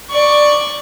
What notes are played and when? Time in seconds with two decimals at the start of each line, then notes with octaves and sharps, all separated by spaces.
0.11 D5 C#6